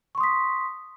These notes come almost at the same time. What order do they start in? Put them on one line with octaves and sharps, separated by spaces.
C#6 C6 D#6 B6